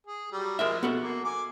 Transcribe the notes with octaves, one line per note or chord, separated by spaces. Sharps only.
G#4
F#3 G3
F3 G#3 A#4 C5 E5
B3 F#4 A4
A#3
G#5 D6